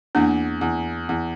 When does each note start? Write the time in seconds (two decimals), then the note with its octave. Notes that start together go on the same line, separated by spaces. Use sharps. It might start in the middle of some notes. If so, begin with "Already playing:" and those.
0.15 E2 A#3 D4
0.61 E2
1.09 E2